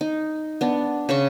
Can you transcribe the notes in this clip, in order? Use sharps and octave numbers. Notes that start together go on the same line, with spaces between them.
D#4
B3 D4
C#3 A5 B5 C#6